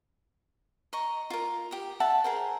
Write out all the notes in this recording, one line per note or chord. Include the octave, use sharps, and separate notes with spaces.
D#5 A#5 C#6
F4 A#4
G4 D#6
E5 F#5 A5
G#4 A#4 C5